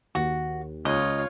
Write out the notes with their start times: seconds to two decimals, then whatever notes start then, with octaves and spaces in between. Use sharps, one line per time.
0.15 D#2 F#4
0.85 C#2 F4 C#5 D#5